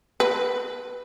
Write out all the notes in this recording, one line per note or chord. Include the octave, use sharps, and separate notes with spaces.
B4